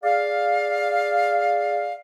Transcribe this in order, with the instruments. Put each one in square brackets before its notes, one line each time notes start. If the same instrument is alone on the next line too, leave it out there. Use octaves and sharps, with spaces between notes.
[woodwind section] G#4 D5 F5